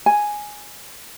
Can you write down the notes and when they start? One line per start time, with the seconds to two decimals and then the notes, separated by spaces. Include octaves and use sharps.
0.06 G#5